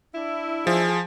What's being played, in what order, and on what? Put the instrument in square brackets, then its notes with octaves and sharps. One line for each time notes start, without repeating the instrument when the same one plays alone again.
[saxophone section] D4 E4
[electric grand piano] F3 [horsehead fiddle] G#4